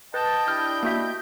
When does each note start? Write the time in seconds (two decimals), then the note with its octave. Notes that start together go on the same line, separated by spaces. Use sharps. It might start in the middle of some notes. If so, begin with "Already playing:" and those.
0.14 B4 D#5 G5 A5 G6
0.48 D4 E4 G4 F6
0.83 A#3 F#4 E5